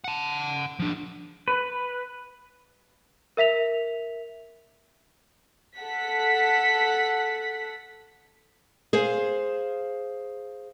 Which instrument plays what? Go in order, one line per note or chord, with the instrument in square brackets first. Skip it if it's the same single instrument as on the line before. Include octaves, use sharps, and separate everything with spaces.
[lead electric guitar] F#5 A5
F3 D4
[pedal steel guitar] B4
[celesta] A#4 E5 B6 F7
[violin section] A4 F#5 B6
[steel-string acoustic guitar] G#4 C5 F5